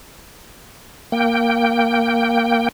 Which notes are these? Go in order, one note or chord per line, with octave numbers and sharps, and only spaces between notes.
A#3 G5